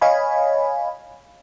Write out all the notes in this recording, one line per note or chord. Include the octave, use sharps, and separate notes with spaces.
C#5 D#5 F5 G#5 B5